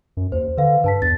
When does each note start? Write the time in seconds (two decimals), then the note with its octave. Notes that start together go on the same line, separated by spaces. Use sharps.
0.17 F#2
0.32 D#2 C5
0.57 D3 B4 F5
0.84 G2 B4 A5 B6
1.02 E2 A6